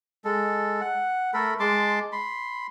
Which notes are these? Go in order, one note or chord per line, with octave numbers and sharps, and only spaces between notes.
G#3 A4
F#5
A3 A4 A#4 B5
G#3 A5 C6 D6
B5 C6